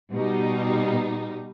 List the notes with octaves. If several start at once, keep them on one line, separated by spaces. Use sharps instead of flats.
B2 G3 D#4